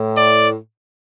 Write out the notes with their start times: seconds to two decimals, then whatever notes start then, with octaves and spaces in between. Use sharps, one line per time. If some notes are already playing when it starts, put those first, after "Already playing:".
Already playing: A2
0.17 D5